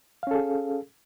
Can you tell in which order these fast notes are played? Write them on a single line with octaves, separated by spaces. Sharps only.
F5 C#4 A4 G#4